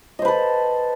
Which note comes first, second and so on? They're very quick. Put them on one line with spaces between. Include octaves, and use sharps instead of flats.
D#5 C5 B4 A4